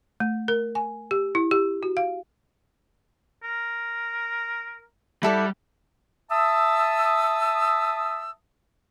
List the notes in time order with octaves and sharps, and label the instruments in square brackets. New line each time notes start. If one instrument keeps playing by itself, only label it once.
[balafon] A3
A#4
G#5
G4
E4
G4
F#4
F5
[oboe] A#4
[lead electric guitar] G3 [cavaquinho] E4 A4 D5 [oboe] F#5
[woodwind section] E5 A5 D#6 E6